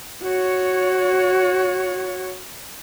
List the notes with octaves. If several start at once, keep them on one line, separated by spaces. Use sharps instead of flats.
F#4 C#5